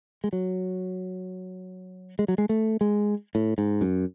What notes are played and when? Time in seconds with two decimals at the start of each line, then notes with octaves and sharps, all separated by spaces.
0.24 G#3
0.33 F#3
2.19 G#3
2.28 F#3
2.38 G#3
2.49 A3
2.81 G#3
3.35 A2
3.58 G#2
3.81 F#2